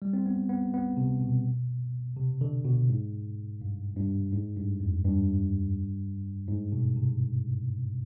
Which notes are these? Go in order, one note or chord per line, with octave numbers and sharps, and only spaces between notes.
G3
C4
B3
B3
B3
C3
B2
C3
D3
B2
G#2
G2
G2
G#2
G2
F2
G2
G#2
B2
C3